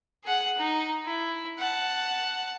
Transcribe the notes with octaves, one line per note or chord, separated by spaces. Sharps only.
G#4 F#5
D#4
E4
F#5 A5